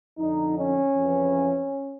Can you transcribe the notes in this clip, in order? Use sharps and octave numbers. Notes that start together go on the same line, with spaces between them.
F2 D3 D#4
C#4
F2 C#3 E3